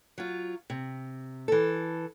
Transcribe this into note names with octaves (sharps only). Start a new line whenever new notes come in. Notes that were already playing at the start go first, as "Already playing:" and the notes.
F#3 F4
C3
E3 A4